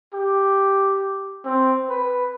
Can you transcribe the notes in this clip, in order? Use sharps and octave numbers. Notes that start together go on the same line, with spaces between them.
G4
C4
B4